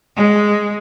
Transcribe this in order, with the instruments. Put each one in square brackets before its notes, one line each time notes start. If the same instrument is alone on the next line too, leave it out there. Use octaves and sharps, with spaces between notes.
[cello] G#3